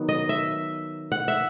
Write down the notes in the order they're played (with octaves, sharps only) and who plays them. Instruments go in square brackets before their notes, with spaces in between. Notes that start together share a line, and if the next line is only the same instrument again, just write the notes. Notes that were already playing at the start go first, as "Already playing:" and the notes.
Already playing: [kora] D#3 F#3 B3
D#5
E5
F#5
E5